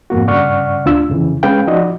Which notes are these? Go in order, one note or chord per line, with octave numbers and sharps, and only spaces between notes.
F2 G#2 A#3 F#4
G2 C#3 D5 F#5 C#6 F6
D2 D4 F4 E6
F2 C#3 E3
G#3 C#4 G#4 B4 F5 G5
F3 D#4 F#4 D5 D#5